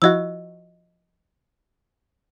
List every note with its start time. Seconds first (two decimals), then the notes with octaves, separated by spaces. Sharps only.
0.02 F3 E4 F#4 D#5 E6